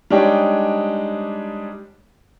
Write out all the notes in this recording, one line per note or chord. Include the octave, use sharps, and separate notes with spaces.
G3 G#3 D4 D#4 C#5 G5